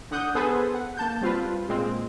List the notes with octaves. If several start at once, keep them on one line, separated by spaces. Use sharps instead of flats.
D3 F#5 D#6 G6
B3 G#4 A4 B4 C5
F#5
A#3 A5 G6
G3 C4 F4 B4
A#2 G#3 C4